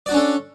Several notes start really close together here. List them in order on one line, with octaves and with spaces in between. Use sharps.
D5 F#4 D4 C#4 A4